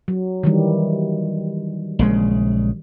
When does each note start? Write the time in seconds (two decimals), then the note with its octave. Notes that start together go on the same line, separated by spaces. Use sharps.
0.08 F#3
0.43 D#3 E3 G3
1.99 A#1 C#3 G#3